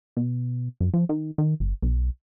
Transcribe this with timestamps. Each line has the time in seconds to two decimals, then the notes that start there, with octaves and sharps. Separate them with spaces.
0.17 B2
0.80 F#2
0.94 F3
1.09 D#3
1.38 D#3
1.60 G1
1.82 B1